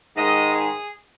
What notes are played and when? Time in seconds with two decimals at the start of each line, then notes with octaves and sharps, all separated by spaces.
0.17 G#2 D#3 G#3 D#5
0.53 G#4